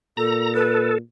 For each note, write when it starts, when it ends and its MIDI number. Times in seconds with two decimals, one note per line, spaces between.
0.17 0.99 46
0.17 0.54 69
0.17 0.54 82
0.54 0.98 69
0.54 0.91 71